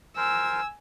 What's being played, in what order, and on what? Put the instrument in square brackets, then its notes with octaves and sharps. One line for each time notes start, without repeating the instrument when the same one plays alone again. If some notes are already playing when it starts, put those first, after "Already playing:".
[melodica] A#4 C5 [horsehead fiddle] G#5 [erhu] E6